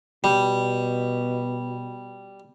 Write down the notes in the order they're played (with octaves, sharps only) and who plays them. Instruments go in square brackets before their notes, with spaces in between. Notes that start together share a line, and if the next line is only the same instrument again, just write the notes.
[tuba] B2 [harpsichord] G3